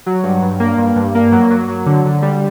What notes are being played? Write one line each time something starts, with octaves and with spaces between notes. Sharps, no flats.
F#3
G2
G2
A#3
G2
G2
A#3
F#3
F#3
F#3
D3
D3
G3